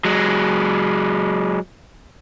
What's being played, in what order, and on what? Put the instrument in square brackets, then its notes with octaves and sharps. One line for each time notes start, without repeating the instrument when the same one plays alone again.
[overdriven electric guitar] F#3 G#3